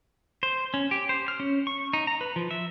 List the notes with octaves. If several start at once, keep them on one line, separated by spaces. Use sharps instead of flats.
C5
C#4
G4
C5
F6
C#4
C#6
D#4
A#5
B4
F3
E5